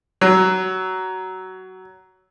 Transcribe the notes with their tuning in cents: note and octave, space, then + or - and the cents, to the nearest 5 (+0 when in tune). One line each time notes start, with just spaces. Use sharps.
F#3 +15